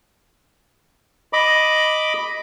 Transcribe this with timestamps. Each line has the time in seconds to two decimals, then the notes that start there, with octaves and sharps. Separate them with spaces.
1.33 D#5 B5 D6